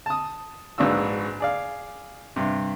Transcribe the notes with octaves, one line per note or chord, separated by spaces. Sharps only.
A5 D#6
A#1 G#2 B3 D4 F#4 E6
G#4 D5 F5
G2 C3